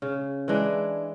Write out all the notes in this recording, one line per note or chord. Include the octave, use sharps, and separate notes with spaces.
C#3
E3 G#3 D4